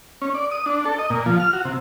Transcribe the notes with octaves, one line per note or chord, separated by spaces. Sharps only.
C#4
D5
D#6
D4
A4
D#5
A#2
F3
F6
F#4
C3